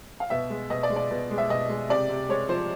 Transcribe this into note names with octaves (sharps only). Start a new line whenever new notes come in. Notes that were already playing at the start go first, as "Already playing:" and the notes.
F5
B2 E5
G#3
B2 D#5
D5
G#3
D5
B2
G#3
E5
B2 D#5
G#3
C3 D5
C3
G#3 C#5
F3 C5